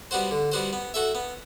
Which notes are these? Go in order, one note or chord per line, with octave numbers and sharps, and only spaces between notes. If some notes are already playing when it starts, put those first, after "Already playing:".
G3 B3 F#4 C5
D3
G3 B3 F#4 C5
B3
F#4 A4 E5
B3